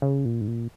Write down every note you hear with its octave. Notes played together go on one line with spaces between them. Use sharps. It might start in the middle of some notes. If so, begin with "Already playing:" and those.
C#3
A#2
G#2
A#2